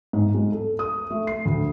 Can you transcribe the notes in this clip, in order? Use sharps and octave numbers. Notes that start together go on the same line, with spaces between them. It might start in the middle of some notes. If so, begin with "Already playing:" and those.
G#2
G#3
A4
D#6
A3
C7
D2